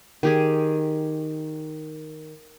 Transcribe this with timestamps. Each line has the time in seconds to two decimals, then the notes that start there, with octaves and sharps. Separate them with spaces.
0.23 D#3 G4 G#4